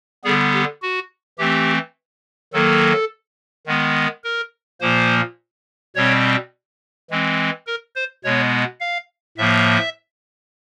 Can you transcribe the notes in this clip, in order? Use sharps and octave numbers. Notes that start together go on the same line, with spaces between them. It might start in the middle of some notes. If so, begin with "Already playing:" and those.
D3 G3 B3 G#4
G4
F#4
E3 A3 C4 G4
D#3 F#3 A#3 A4
D#3 G#3 B3
A#4
A#2 F3 A#3 C5
B2 G3 C4 C#5
E3 G#3 C4
A#4
C5
B2 G#3 B3 C#5
F5
A2 F3 A#3 E5